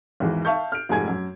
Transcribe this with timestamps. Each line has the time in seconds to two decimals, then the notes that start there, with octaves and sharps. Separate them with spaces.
0.20 G#1 E2 E3
0.45 E5 F5 A5 C#6 G6
0.72 F6 D7
0.89 F1 G#2 G#5 G#6
1.08 F#2